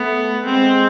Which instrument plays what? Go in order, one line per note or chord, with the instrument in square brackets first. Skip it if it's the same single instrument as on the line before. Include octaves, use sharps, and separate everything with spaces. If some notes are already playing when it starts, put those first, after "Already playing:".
Already playing: [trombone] A3 [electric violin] B3
[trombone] G#3 [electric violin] C4